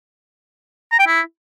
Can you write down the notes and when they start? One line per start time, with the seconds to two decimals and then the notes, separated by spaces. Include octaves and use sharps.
0.92 A#5
0.99 G5
1.07 E4